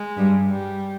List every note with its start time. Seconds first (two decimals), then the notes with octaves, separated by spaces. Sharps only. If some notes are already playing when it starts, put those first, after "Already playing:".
Already playing: G#3
0.17 G2 G3
0.49 G3